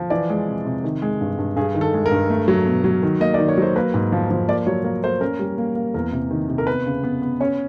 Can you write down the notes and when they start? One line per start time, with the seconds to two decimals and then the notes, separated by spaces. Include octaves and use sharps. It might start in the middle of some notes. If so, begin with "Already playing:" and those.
Already playing: F3
0.10 E3 D5
0.30 G#3
0.48 C3
0.65 C3
0.84 D#3
1.02 G#3
1.21 G2
1.38 G2
1.56 G2 G#4
1.75 D#3
1.81 A4
1.94 G#3
2.06 A#4
2.11 G2
2.30 A3
2.48 F#3
2.66 B2
2.84 F#3
3.03 D#3
3.20 A#3 D#5
3.34 D#3 D5
3.49 C#5
3.57 F#3 C5
3.76 A#3 B4
3.94 G#2
4.12 F3
4.31 F3
4.48 A#3 D5
4.67 F#3 C#5
4.84 A#3 C#5
5.03 A#3 C5
5.21 C#4 A#4
5.39 G3
5.58 A#3
5.76 A#3
5.94 E2 A#4
6.12 C3
6.31 D#3
6.49 C3
6.58 A#4
6.67 B3 B4
6.86 C#3
7.03 B3
7.22 B3
7.40 C#4 C#5